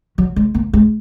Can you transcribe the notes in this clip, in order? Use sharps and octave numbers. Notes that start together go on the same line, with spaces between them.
F#3
G#3
A#3
G#3